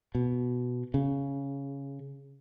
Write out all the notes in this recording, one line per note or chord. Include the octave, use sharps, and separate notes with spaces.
B2
C#3